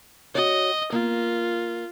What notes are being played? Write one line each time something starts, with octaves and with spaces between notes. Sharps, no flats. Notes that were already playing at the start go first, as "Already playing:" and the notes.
F#4 C#5 D#5
A#3 F4